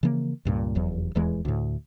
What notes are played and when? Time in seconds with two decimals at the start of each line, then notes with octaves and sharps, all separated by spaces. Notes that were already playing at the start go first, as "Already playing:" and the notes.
0.03 C#3 E3 F3 A#3
0.45 C#2 G2 A#2
0.75 F1 E2 F#3
1.15 D#1 E2 E3 G#3
1.45 D2 A2